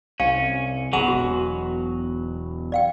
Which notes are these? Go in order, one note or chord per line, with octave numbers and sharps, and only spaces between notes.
C2 C#4 F5
G1 B2 F#3 G#4 F#5 G#5
E1 F#4
D5 F5 G5